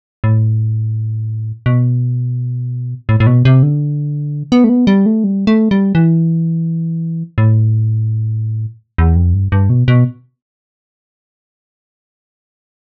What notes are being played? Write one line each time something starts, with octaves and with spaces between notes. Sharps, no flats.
A2
B2
A2
A2
B2
C3
D3
B3
A3
B3
G3
A3
G3
A3
G3
E3
A2
E2
F2
G2
G2
B2
B2